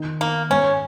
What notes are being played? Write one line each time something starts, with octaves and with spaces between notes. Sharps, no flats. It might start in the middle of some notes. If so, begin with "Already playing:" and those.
Already playing: D#3 D#4
A#3 D#4
G#2 C#4